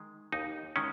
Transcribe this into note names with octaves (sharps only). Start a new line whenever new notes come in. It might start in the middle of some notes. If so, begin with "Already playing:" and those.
Already playing: D#3 G#3
D#2 D#4
D#3 G#3 C#4